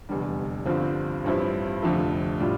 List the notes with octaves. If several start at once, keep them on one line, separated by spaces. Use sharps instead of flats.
F1 E2 D3 G3
G1 G2 D3 F3 C4
A1 G2 F3 C4 E4
F1 F2 D3 F3 A3
A2 G3 D4 F4